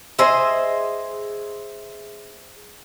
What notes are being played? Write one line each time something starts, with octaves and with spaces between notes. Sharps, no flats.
G#4 C5 D#5 E5